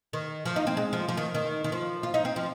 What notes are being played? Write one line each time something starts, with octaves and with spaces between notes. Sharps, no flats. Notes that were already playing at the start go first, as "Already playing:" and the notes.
D#3
F3
D#4
C4
G#3
F3
F3
D#3
D#3
D#3
F3
F4
D#4
C4
F3